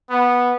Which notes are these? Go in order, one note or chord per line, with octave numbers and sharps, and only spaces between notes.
B3